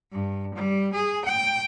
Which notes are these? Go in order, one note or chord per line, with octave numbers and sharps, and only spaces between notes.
G2
G3
G#4
G5